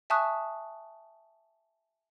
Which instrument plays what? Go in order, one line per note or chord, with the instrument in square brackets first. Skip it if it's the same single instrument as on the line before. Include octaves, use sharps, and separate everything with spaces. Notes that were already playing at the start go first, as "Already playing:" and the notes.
[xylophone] E5 G#5 A5 C#6 D#6 F#6